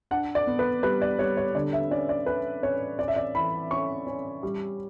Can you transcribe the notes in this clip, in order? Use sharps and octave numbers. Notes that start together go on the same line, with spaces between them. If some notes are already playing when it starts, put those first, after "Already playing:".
D4 F#5
D5
B3
B4
G3 B4
D5
G3 C#5
C#5
D3 D5
E5
C#4 D5
D5
C#4 B4
C#4 C#5
C#4 D5
E5
D5
E3 B5
C#4 C#6
C#4
G3